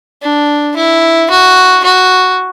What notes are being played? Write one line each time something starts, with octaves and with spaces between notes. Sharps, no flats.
D4
E4
F#4
F#4